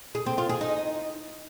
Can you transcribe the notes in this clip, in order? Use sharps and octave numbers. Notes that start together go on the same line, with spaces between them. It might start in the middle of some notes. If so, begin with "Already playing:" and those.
G#4
C4
F4
G#4
D#4